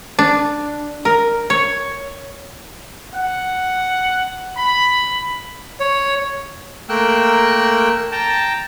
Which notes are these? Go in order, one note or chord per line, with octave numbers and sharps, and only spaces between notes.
D4
A#4
C#5
F#5
B5
C#5
A3 A#3 A#4 G5 E6 F#6
G5 A5 A#5